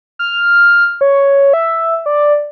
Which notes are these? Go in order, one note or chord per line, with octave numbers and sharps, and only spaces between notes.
F6
C#5
E5
D5